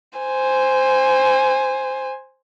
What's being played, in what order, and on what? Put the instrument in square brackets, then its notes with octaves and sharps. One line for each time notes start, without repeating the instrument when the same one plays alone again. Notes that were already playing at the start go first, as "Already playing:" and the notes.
[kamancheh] C5 G#5